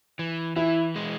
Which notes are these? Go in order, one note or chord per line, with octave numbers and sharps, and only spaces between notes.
E3
E3 E4
G#3